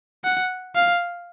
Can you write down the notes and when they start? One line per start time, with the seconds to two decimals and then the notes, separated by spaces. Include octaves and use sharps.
0.25 F#5
0.75 F5